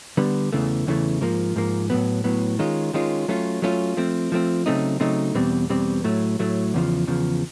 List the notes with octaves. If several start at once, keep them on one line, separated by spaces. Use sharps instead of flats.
D3 G3 B3
E2 C#3 E3 A3
E2 C#3 E3 A3
G#2 F3 A#3
G#2 F3 A#3
A2 F#3 B3
A2 F#3 B3
D#3 G#3 C#4 F4
D#3 G#3 C#4 F4
F#3 A3 C#4 F4
F#3 A3 C#4 F4
F3 A3 C4
F3 A3 C4
C#3 F#3 A3 C4 D#4
C#3 F#3 A3 C4 D#4
E2 B2 G3 C4
E2 B2 G3 C4
A2 F#3 A3
A2 F#3 A3
E2 C#3 F3
E2 C#3 F3